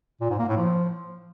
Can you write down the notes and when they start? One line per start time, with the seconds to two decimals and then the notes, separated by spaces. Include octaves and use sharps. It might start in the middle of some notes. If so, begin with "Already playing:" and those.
0.21 A#2
0.30 G#2
0.39 A#3
0.48 A2
0.57 F3